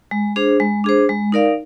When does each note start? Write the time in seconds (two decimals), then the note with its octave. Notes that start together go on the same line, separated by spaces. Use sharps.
0.11 G#3
0.36 D4 G#4 C5
0.60 G#3
0.84 D4 G#4 C5
1.09 G#3
1.32 D#4 A#4 D5 F5